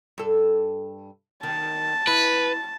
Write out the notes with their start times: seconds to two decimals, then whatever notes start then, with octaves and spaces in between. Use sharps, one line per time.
0.18 G2 A4
1.43 D#3 A5
2.07 E4 B4